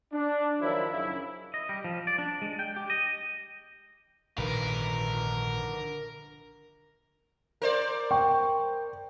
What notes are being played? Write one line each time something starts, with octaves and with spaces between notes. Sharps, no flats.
D4
D#3 F3 F#3 E4
F#2 C#3 E4
D#5
G3
F3
D5
D4
G#3
G5
G4
D#5
A#1 G#2 D3 D#3 A#4 B4
A#4 C5 D5
G5 C#6